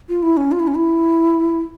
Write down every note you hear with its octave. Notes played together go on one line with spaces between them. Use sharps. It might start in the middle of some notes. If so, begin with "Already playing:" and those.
F4
E4
C#4
F4
E4
C#4
E4